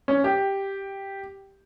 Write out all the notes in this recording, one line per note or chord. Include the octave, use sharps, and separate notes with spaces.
C#4
G4